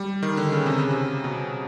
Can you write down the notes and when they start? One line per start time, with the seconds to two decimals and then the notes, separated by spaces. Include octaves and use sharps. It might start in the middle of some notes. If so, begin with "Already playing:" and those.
Already playing: G3
0.23 D#3
0.37 D3
0.52 C#3
0.66 C3
0.78 C#3
0.90 C3
1.24 B2